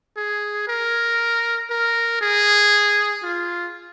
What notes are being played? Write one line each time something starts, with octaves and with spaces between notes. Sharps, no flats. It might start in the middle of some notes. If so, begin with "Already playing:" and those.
G#4
A#4
A#4
G#4
F4